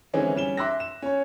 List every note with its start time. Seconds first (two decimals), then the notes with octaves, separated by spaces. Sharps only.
0.13 D3 E3 G#3 C4 C#4 D#4
0.35 G3 C#4 E7 G7
0.57 E5 C6 D6 E6 F#6 A#6
0.80 E7
1.02 C#4 C#5